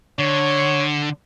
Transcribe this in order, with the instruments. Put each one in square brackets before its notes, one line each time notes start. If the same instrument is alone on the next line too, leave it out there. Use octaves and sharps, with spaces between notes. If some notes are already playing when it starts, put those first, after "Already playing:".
[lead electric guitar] D3 [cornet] C#5